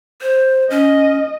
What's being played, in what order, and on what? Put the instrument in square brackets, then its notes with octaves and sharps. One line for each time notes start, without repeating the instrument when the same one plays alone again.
[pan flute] C5
[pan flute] C#4 [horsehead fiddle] D#5